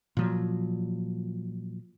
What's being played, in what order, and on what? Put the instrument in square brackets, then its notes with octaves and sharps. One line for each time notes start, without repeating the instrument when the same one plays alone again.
[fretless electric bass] A#2 F3 F#3